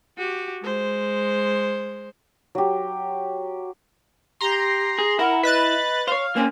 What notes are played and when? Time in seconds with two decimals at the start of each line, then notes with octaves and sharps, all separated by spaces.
0.18 F#4 G4
0.62 G#3 C5
2.55 F#3 G4
4.41 G4 A#5 C6
4.99 G#4
5.19 E4 A#4 F#5
5.43 B4 D#5 F#6 A6
6.07 C5 C#5 F5
6.36 A#3 C4 C#4 G#5